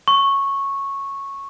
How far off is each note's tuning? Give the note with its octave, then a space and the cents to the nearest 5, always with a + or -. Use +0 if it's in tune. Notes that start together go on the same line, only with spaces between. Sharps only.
C#6 -10